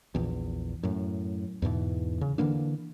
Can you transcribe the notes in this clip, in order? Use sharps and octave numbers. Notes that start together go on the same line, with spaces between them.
A#1 E2
F#2 A2
E2 G#2 B2 E3
C#3
D3 E3 A#3 D4